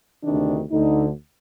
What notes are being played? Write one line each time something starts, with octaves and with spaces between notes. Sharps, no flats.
D2 C3 D#3 D4
D2 D3 D#4